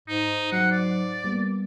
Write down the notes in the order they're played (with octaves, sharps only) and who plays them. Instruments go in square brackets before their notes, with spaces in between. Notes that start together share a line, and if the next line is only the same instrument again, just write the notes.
[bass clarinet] G#2 [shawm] D#4
[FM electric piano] F#3 C7 [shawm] F#5
[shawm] D5
[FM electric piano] G3 A#3 B3